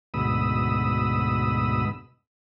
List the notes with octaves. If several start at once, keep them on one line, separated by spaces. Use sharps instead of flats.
D2 G#2 B2 B5 D#6 E6